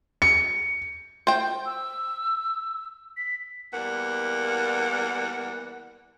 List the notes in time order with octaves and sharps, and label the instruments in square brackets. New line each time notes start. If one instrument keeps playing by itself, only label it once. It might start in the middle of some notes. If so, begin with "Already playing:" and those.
[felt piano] C#7
[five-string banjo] C5 G5
[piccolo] E6
B6
[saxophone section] E2 G3 A#3 B4 F#5